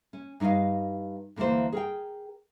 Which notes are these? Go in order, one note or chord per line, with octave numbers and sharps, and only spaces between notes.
C#4
G2 D#4 C#5 D#5 F5
D2 D3 E3 A#3 C5
G#4 A#4 G5